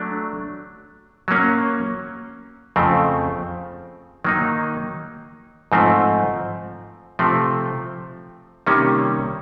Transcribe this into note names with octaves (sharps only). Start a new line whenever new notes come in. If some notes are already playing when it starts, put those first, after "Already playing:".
Already playing: F#3 A3 D4
F#3 A#3 C#4
F2 C#3 F3 A3 C4
D#3 F#3 A#3 D#4
G#2 F3 A3 C4
C3 F3 A3 C4
C3 D#3 G3 A#3 C#4